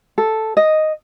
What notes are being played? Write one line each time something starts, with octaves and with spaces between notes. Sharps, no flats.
A4
D#5